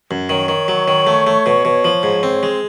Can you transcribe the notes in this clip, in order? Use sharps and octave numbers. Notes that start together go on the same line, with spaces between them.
F#2
D#3 C#5
D#3
F#3
D#3
A3
A3
B2
B2
F3
G#2
C4
G#3